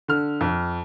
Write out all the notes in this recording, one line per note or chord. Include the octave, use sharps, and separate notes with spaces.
D3 F6
F2